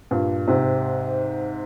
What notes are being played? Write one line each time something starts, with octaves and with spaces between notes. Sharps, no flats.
G2 A#2
G#2 C3